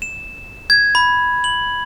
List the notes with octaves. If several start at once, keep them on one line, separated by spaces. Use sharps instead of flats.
E7
G#6
B5
F#7